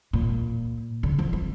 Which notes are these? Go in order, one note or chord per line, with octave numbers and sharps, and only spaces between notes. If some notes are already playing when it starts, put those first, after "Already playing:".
A#2
D3
F3
F3